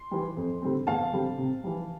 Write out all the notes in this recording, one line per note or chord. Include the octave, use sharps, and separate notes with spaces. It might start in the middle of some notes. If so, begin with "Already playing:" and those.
Already playing: C6
E3 G3
F2
D3 G3 C4
E2 F5 A5
D3 G3 C4
C3
E3 G3